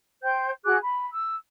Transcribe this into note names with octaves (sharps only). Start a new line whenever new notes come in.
C5 G5 G6
F#4 G#4 D6 F#6
B5
E6